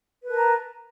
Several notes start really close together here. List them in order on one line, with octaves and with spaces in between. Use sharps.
B4 A#4 A5 A#5